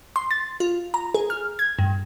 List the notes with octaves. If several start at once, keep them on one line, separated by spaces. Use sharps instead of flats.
C6
A6
F4
A#5
G#4
F6
G#6
G2